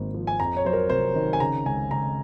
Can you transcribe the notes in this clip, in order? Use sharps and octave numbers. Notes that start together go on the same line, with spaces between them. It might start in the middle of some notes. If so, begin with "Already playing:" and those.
Already playing: G#1 G#2 A#3
F3
G#5
F2 A#5
C#5
F#3 C5
A#4
F1 C5
D#3
G#5
C#3 A#5
C#2 G#5
C#2 A#5